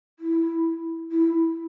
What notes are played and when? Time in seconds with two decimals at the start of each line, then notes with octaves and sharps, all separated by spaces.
0.19 E4
1.11 E4